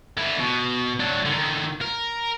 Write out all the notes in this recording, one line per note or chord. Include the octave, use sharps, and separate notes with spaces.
D3 E4
B2
F#3 D4
D3 D#3
A#4